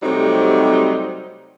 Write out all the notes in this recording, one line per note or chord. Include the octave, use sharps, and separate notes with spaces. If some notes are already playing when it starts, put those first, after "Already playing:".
C3 F#3 G3 A3 C4 D#4